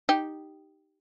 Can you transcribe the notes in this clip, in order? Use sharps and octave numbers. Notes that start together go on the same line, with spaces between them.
D#4 G4